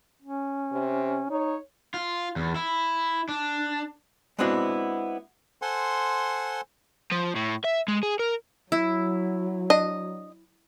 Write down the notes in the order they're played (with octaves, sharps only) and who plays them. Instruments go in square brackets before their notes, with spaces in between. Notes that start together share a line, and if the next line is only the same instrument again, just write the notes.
[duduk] C#4
[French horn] C3
[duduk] D#4 [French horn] C#5
[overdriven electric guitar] F4
E2
E4
D4
[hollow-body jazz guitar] G#3 B3 C4 D4 E4 F#4
[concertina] A4 C5 F#5 G#5 C6
[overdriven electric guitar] F3
A2
E5
G#3
G#4
A#4
[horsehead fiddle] F#3 [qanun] E4
[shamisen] D4 [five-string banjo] D#5